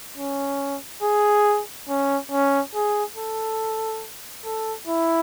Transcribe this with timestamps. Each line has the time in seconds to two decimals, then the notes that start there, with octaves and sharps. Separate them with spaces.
0.17 C#4
1.02 G#4
1.88 C#4
2.31 C#4
2.74 G#4
3.16 A4
4.44 A4
4.87 E4